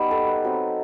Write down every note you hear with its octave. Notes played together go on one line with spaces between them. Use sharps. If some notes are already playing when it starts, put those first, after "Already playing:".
Already playing: G3 B3 D#4 G4
A4
B4
F#3 C4 D#4